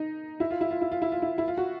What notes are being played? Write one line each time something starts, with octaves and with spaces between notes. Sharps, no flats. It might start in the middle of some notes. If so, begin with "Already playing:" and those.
Already playing: D#4
E4
F4
E4
F4
E4
F4
E4
F4
E4
E4
F4
F#4